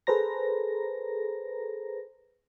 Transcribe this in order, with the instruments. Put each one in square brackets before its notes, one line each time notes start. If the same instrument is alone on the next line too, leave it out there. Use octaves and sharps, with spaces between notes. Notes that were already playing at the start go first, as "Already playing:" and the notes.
[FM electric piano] G#4 A4 B4 C5 A#5 A#6